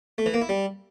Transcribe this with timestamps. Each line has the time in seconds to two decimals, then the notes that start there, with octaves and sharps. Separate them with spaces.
0.18 A3
0.26 E3
0.34 A#3
0.41 E4
0.49 G3